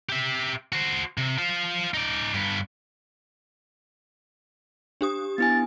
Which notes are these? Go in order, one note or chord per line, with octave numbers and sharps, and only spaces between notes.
G4 E5
F#4 C5
C3
F4 C5
D#4 D5
G2 B3
D4 G4 D#6
B3 E4 G#5 A6